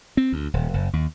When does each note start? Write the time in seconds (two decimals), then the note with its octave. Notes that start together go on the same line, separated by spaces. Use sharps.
0.17 C4
0.32 D2
0.54 D#1
0.74 F#1
0.93 D#2